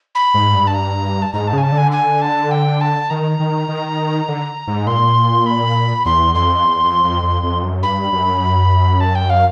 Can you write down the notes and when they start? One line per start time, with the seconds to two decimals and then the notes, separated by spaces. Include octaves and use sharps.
0.15 B5
0.34 G#2
0.54 G2
0.67 A5
0.74 A#5
1.22 A5
1.33 G#2 A#5
1.47 A5
1.53 C#3 G#5
1.63 A5
1.72 D3
1.77 G#5
1.91 G#5
2.21 A5
2.51 G5
2.81 A5
3.10 D#3 A#5
3.40 D#3
3.68 D#3
4.28 D3
4.67 G#2
4.87 A#2 C6
5.46 B5
6.05 E2 C6
6.34 F2 C6
6.64 E2
6.84 F2
7.04 F2
7.23 F2
7.43 F2
7.63 F#2
7.82 G2 B5
8.12 F#2
9.00 A5
9.15 G5
9.30 F5